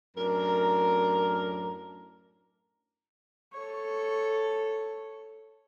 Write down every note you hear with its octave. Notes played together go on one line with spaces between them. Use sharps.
F#2 A2 D4 A#4
A4 C#5